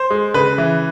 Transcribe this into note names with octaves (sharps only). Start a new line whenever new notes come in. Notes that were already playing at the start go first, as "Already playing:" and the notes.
Already playing: C5
G#3
C#3 B4
E3